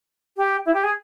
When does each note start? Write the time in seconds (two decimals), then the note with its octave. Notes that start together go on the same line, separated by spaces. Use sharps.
0.37 G4
0.66 E4
0.74 G4
0.84 G#4